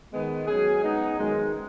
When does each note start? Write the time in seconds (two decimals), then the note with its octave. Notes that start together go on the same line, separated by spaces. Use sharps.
0.12 D#3 G#3 B3
0.47 F#3 C#4 G#4
0.82 G#3 B3 D#4
1.16 F#2 D#3 G#3